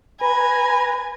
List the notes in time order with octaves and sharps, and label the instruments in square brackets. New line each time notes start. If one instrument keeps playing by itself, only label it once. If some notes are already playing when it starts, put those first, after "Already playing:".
[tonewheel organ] B4 A#5 [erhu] G#5 [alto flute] B5